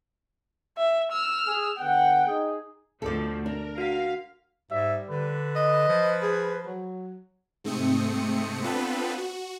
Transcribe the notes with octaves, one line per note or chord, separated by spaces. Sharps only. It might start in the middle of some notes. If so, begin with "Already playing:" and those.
E5
E6 F6
G#4
D3 B3 F#5 G5
D#4 G#4
D2 B2 F3 A4 D5
D4 A#4
F#4 F5 B6
G#2 G3 E5
D3 B4
D#5
F3
G#4
F#3
G#2 C3 A3 C4 D#6 C#7
B3 C4 D4 F4 A4 B4
F#4